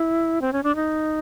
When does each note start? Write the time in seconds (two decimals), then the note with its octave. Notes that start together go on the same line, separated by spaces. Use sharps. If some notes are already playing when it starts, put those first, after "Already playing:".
Already playing: E4
0.42 C4
0.53 C#4
0.63 D4
0.76 D#4